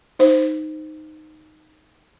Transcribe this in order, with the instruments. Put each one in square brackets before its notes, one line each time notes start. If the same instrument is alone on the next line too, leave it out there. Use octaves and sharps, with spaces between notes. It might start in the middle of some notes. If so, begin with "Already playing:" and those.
[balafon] D#4 C5